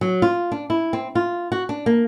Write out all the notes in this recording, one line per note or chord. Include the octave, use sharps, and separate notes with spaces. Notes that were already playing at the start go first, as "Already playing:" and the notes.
F#3
F4
D4
E4
C4
F4
F#4
D4
A#3